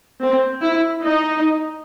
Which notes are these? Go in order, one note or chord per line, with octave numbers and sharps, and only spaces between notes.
C4
E4
D#4